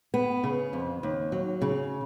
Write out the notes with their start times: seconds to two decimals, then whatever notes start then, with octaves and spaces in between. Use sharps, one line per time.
0.14 B3
0.44 C#3
0.73 F2
1.03 D#2
1.32 F#3
1.62 C#3